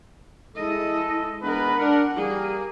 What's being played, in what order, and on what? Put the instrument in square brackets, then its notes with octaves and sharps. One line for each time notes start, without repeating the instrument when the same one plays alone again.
[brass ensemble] G#3 A4 [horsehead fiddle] E4 D#5
[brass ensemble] G#3 B3 B4 [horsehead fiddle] D4 A#4
[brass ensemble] D4 A#4 [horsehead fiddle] F#5
[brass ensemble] G3 A#3 [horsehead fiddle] G#4